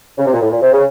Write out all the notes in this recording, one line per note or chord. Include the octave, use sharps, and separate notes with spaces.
C#3
C3
A#2
A2
A#2
C3
C#3